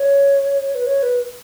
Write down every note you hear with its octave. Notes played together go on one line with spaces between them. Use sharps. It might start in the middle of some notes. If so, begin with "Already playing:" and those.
Already playing: C#5
B4
C#5
B4